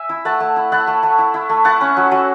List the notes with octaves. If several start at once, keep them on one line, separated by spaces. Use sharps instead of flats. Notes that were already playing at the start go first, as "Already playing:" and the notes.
Already playing: E5 G#5
E4
A3 F#5 A5
A3
E4
E4 F#5 A5
A3
A3
E4
E4
A3
E4 F#5 A5
C#4
F#3
F#3